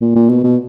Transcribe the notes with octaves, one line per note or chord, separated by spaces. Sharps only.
A#2
A#2
B2
B2